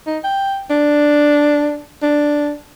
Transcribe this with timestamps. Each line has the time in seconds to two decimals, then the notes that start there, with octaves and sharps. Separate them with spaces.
0.07 D#4
0.24 G5
0.70 D4
2.03 D4